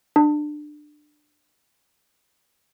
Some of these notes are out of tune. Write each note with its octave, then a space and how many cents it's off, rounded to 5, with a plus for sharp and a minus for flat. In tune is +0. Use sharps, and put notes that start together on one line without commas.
D4 +25